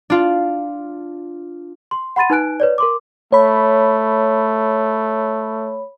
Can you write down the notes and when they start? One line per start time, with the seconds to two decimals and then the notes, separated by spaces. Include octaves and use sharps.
0.10 D4 F4
1.91 C6
2.16 F#5 B5 C6 A6 D#7
2.30 D#4 B4 G#5 F#6 D7
2.60 B4 C#5 D5
2.78 A#4 C6 D6
3.32 A3 C#5 B5